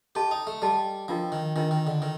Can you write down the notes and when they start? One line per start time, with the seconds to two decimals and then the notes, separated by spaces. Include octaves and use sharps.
0.15 G4 A4 D#5 A5 C6
0.31 D#4
0.47 A3
0.62 G3 A4 D#5 A5 C6
1.08 F3 D4 F4 A#4 D#5 G5
1.32 D#3
1.56 D#3 D4 F4 A#4 D#5 G5
1.71 D#3
1.87 D3
2.02 D#3 A#4